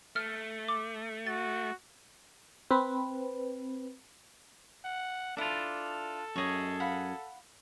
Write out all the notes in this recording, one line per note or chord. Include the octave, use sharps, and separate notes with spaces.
A3 F6
D6
F#4 A6
C4 B4
F#5
D4 E4 F4 A4 D5
F#2 G#4 C#5 D#5
F5 F#5 B5